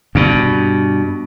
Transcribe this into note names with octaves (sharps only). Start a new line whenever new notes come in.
G2 B2